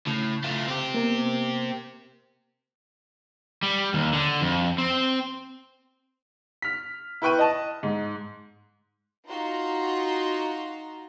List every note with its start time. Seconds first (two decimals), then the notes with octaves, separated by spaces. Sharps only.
0.07 A2 C#3
0.44 A3 F4
0.67 C4 G4
0.94 A#3 B3 A#4
3.63 G3
3.94 D#2
4.13 D3
4.41 F2
4.78 C4
6.62 F6 B6
7.22 E4 B4 G5 C#6 F#6 D#7
7.39 D#5 A5
7.83 G#2
9.28 D#4 F4 F#4 A#5 C6